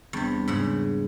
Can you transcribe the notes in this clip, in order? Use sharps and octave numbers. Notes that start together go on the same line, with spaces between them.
E2 C3 G3 D4
G#2 C#3 F#5